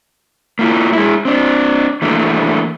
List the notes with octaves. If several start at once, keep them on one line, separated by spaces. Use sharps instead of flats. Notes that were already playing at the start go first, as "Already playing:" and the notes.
A#3 E4 F4
G#3 E4
C4 D4
E3 A3 A#3 D4